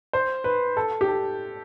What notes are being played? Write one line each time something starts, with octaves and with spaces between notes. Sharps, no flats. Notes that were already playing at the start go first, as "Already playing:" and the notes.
C5
B4
A4
G4
A4